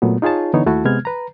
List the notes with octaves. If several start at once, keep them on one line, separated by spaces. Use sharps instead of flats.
A#2 F#3 A3 B3
D#4 F4 G#4 C#5 A5
D3 E3 B3 D#4 C#5
D#2 A3 E4 F#4 A5
C3 G#3 B3 F6 G#6
B4 A#5